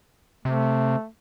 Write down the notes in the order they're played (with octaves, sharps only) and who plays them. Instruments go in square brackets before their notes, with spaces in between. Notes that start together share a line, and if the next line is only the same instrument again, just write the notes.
[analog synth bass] C3 [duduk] A3